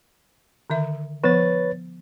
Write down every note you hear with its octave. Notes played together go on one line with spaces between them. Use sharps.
D3 D#3 E5
F3 B3 B4 C#5 A6